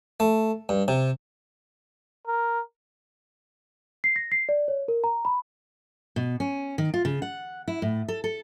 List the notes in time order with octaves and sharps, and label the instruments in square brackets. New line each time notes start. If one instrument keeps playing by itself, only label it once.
[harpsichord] A3
G2
C3
[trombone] A#4
[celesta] C7
A#6
C7
D5
C#5
A#4
A#5
B5
[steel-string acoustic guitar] B2
C#4
D#3
F4
C#3
F#5
E4
A2
A4
A4